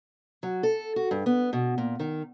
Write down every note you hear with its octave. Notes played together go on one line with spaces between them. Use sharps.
F#3
A4
F#4
G2
B3
B2
A#2
D#3